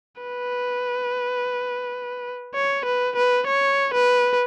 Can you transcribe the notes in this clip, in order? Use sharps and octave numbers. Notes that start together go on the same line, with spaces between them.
B4
C#5
B4
B4
C#5
B4